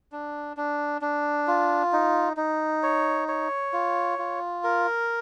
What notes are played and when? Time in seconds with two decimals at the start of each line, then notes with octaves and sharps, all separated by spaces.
0.12 D4
0.57 D4
1.01 D4
1.47 F4
1.93 D#4
2.37 D#4
2.83 C#5
3.28 C#5
3.73 F4
4.19 F4
4.64 A#4